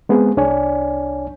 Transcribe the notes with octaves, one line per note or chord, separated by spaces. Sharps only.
G#3 B3 C4 G#4
C2 D4 C#5 D5 G#5